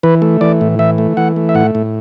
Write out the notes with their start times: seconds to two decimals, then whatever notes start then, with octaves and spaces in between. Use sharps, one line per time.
0.03 E3 B4
0.22 A3
0.41 E3 D5
0.61 A2
0.79 E3 E5
0.98 A3
1.17 E3 F#5
1.36 A3
1.49 E5
1.55 A2 F#5
1.75 A2